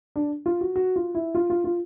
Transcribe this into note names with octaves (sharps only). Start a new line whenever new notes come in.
D4
F4
F#4
F#4
F4
E4
F4
F4
F4